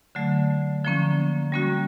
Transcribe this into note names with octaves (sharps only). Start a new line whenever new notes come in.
D3 F#3 A3
D3 F3 A#3 C#4
G3 A#3 C#4 F#4